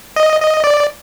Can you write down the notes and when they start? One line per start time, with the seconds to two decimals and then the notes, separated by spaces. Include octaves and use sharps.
0.16 D#5
0.41 D#5
0.64 D5